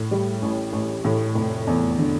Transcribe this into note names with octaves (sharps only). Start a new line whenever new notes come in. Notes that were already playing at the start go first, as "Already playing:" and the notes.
Already playing: A2
G3
A1
A1
A2
F1
E2
D3